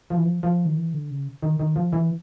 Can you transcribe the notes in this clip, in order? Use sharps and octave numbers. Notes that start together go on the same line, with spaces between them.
F3
E3
F3
F3
D#3
E3
D3
C#3
D#3
D#3
F3
E3